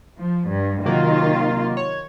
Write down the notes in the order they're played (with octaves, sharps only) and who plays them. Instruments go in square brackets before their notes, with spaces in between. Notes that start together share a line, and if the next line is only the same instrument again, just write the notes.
[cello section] F3
G2
[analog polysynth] C3 F#3 A#3 [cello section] D#3 F4
[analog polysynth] C#5